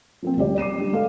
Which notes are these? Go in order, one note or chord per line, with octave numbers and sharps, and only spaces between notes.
F3 A#3 C4
D2 G3 G4 D5
D6 C7 D#7 E7
G3 D4 G4
G#3 A4 B4 F5